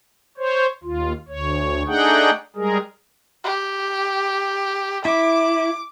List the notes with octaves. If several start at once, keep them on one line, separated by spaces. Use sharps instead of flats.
C5 C#5
D#2 F4
D2 C#5
A3 D4 D#4 G#4 F#5 G5
G3 G#3 G#4 A#4
G4
E4 D6